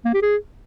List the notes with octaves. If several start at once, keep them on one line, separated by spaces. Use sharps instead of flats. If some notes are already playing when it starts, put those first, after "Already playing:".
A#3
G4
G#4